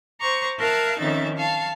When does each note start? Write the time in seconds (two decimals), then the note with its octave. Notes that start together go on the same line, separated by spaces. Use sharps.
0.20 C5 A#5 C#6 D6
0.59 A#4 E5 F5 A5 F#6 G#6
0.98 F2 D#3 C#4 D#4 E5 A6
1.36 F5 A5 C#6